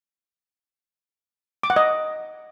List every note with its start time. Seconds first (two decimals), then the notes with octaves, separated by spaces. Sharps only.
1.63 D6
1.70 F#5
1.76 D#5